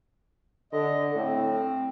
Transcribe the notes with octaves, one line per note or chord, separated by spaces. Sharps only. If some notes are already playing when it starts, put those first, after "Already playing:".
D3 D#5
A2 C4